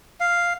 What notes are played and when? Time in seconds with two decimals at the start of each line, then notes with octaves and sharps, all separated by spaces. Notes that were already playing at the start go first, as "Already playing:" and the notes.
0.20 F5